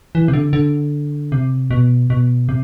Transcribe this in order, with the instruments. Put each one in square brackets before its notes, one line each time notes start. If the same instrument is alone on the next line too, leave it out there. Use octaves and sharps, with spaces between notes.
[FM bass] E3
C3
D3
D3
C3
B2
B2
C3